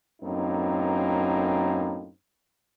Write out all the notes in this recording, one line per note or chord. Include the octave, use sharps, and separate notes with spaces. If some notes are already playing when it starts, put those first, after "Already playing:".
F#2 A2 A#3 C4 D#4